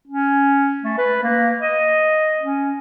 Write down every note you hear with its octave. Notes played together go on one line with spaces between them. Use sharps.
C#4
A3
B4
A#3
D#5
C#4